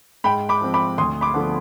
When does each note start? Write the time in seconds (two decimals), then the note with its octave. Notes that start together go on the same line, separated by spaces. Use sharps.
0.24 G#2 G5 B5
0.49 B5 D6
0.61 F3 C4
0.74 B5 D6
0.98 D2 C6 D#6
1.21 B5 D6
1.34 D3 F3 B3